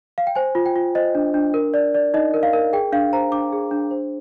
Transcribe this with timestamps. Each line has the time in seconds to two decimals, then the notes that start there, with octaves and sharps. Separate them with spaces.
0.18 F5
0.27 G5
0.35 C5 G#5
0.55 F4
0.66 G5
0.76 F4
0.95 C5 D#5
1.15 D4
1.34 D4
1.54 A#4
1.74 D5
1.94 D5
2.14 D#4 D#5
2.34 A#4
2.43 F5
2.53 A#4
2.73 G#4 G5
2.92 D4 F5
3.13 C5 A#5
3.32 D4 D6
3.52 G#4
3.71 D4
3.91 C5